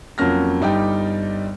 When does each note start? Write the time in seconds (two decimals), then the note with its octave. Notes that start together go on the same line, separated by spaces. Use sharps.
0.18 F2 F#3 A#3 C#4 F6 A#6
0.61 G1 G3 D#4 G4 D5 G5